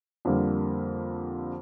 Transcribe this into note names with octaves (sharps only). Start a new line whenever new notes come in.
F2 D3 G3 A#3